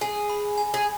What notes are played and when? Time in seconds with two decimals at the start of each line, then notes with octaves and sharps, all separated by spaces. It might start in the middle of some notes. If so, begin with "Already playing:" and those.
0.01 G#4 G#5
0.30 B5
0.58 G#5
0.74 G#4